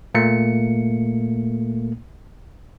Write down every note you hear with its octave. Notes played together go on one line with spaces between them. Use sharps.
A#2 A3 A#3 C#7